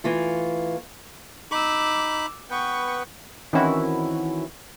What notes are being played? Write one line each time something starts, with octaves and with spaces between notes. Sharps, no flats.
E3 A3 F4
D#4 B5 D6 E6
B3 B4 G5 C#6
D#3 E3 C4 C#4 E4 F#4